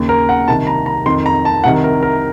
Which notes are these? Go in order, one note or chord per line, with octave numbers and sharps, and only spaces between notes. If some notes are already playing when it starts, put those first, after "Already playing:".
Already playing: D#2 C#3
A#4
F#5
C2 C3 D#3 A5
A#5
A#5
F2 D#3 C6
A#5
A5
C2 C3 D#3 F#5
A#4
A#4